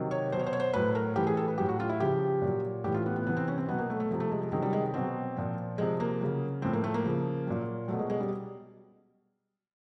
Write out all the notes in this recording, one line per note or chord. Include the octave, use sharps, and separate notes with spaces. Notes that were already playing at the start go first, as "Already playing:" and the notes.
Already playing: C3 D#3 F#3
C#5
B2 F#3 C5
C#5
C5
C#5
C5
A2 F#3 B4
A#4
A2 E3 G4
G#4
A4
B4
A2 F#3 G4
F#4
F4
E4
C#3 F3 G4
A#2 F#3
A2 E3 G4
F4
B3
B3
C3 E3 B3
C4
C#4
C4
B2 F#3 B3
A#3
A3
A3
C3 F3
A3
G#3
G#3
C3 D#3 F#3 G#3
G3
G#3
B2 F#3 C4
A#2 F3
C3 F3 G#3
A#3
C#3 F#3
A2 F3 C4
A#3
A3
A#3
C#3 F3
A#2 F#3
B2 F#3 A3
G#3
G#3
G3